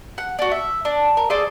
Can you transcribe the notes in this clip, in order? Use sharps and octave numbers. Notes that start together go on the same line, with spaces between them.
F#5
D4 F#4
E5
D4
A#4
G#4 A4 C5 D5